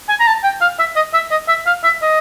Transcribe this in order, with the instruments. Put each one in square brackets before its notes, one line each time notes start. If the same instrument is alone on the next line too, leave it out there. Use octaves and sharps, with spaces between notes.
[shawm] G#5
A#5
A5
G5
F5
E5
D#5
E5
D#5
E5
F5
E5
D#5